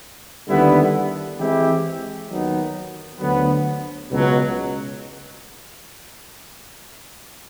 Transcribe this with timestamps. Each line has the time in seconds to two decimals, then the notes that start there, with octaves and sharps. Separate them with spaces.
0.47 D#2 D3 G3 B3 E4
1.38 E3 G#3 C4 E4 G4
2.29 D#2 D#3 F#3 B3 D#4
3.20 D2 D3 F#3 B3
4.10 C#2 B2 F#3